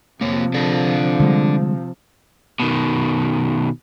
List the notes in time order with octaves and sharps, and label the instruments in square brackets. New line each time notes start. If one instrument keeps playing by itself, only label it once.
[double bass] C3 F3 [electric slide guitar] A#3 C#5
[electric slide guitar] D4 A4 F5
[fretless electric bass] D3 G3 G#3
[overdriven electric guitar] B2 D#3